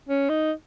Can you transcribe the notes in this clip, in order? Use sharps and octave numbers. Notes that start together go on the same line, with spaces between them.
C#4
D#4